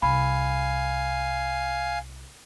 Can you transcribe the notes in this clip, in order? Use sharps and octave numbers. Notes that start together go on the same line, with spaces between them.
C2 F5 G#5 B5